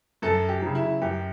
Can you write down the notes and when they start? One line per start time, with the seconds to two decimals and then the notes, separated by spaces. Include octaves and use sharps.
0.22 F#2 A4
0.49 G4
0.62 C#3 F#3
0.75 E4
1.01 F#2 G4